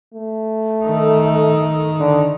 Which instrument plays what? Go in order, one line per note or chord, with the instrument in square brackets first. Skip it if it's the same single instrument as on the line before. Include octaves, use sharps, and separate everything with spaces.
[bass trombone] A3
[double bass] D#3 D#4 [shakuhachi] A4
[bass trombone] D3